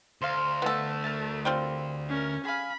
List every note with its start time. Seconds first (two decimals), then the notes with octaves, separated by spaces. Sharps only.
0.21 D2 C5 F5
0.62 A3 B3 A4
1.04 A#4 A5
1.45 G3 C4 F4
2.09 C#4 A#4
2.45 G#4 F5 B5